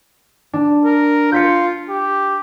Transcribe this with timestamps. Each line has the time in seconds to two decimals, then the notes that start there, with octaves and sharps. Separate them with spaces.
0.53 D4
0.85 A#4
1.32 F4 G6 B6 C#7
1.90 G4